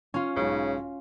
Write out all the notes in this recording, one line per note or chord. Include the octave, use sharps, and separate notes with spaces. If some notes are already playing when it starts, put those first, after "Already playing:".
C#4 F4
B1 G#2 C#3